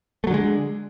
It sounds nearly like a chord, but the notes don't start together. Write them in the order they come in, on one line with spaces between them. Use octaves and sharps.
A3 F#3 D3 G#3